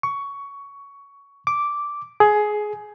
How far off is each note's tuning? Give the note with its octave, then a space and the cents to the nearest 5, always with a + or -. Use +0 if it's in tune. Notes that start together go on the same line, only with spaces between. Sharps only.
C#6 +15
D6 -5
G#4 +15